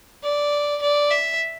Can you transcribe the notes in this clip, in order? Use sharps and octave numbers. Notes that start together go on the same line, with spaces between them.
D5
D5
E5